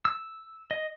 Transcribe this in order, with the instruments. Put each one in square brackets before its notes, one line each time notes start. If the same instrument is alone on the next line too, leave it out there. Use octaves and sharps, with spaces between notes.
[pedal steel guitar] E6
D#5